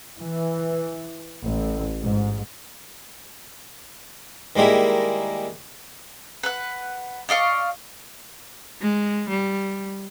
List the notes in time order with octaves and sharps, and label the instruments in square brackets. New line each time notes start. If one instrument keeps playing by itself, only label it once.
[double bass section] E3
A1
G#2
[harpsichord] D#3 G3 G#3 A#3 E4
[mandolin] B4 F#5
D5 D#5 F5 C#6
[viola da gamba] G#3
G3